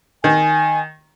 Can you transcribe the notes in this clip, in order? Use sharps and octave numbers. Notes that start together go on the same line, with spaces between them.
D#3 G#5